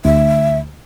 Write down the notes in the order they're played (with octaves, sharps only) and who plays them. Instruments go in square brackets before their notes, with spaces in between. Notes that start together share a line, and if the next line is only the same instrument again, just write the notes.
[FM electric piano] D2 [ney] E5